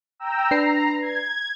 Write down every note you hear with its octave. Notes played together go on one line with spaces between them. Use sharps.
G5 A#5 E6
D4 B4 A#5 C7
G#6